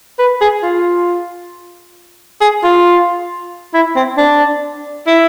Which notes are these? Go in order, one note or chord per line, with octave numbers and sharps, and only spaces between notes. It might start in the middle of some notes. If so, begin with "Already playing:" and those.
B4
G#4
F4
G#4
F4
E4
C4
D4
E4